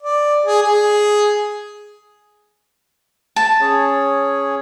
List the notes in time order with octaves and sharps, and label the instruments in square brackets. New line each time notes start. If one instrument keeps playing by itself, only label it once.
[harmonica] D5
G#4
G#4
[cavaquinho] A5
[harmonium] C#4 G#4 C#5